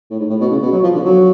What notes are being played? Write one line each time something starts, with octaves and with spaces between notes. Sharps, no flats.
A2
G#2
A2
B2
C#3
B2
F#3
F3
D3
F#3